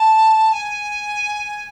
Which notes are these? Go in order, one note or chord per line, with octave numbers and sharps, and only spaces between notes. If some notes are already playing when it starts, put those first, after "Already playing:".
Already playing: A5
G#5